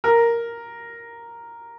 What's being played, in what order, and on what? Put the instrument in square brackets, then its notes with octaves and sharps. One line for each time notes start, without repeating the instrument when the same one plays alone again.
[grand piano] A#4